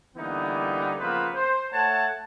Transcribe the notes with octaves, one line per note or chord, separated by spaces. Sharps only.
D3 E3 G3 A#3 B3 D#4
C#3 F3 A#3 B3 B4 C5
C5
A3 C#5 F#5 A5